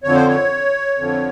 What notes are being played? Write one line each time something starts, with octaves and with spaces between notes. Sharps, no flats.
F2 D3 F3 C#5
C5
C#5
F2 D3 F3